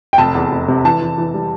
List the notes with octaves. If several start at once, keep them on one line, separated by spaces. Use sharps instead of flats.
G5
F1 A5
E2
F1
C3
E3 A5
E3
E3
G3